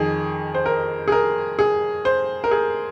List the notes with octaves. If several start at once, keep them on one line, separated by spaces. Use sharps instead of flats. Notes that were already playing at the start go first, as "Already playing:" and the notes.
Already playing: F2 D#3 G#4
C5
A#4
G#4
A#4
G#4
C5
A#4
G#4